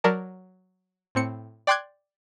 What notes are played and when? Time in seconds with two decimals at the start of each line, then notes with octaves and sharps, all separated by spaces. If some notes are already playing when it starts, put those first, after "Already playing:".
0.04 F#3 A#4 D5 A5
1.15 A2 C4 C#7
1.67 D5 G5 C6 D6 F#6 G#6